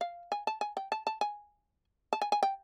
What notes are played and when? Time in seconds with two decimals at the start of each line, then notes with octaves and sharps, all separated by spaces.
0.01 F5
0.32 G#5
0.47 A5
0.61 G#5
0.77 G5
0.92 A5
1.07 A5
1.21 G#5
2.13 A5
2.22 G#5
2.32 G#5
2.43 G5